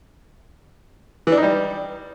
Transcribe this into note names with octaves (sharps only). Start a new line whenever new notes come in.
E3
D4
D#4
G3